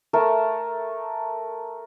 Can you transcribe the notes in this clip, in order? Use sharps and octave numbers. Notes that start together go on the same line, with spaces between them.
A3 A#4 A5 A#5